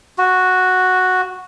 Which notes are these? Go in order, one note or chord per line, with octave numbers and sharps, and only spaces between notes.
F#4